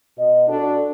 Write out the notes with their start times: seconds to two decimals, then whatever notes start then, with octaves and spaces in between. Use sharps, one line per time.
0.17 B2 D#5
0.48 D4 F#4 A4